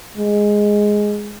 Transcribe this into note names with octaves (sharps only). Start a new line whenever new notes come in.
G#3